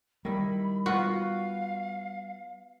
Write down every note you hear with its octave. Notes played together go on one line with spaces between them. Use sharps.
D#3 G3 E4 B5
B3 F4 F#4 B4 F5